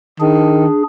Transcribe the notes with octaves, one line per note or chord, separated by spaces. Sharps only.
D#3 D4 G#4